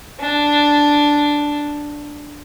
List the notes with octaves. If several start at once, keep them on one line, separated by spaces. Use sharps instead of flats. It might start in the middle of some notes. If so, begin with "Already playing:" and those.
D4